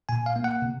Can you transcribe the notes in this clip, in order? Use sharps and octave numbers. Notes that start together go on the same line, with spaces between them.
A#2 G#5
F5
A#3
F#5
C3